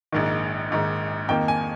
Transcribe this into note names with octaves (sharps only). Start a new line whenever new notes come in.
A#1 G#2 D#3
A#1 G#2 D#3
F2 D#3 A#3 G5
G#5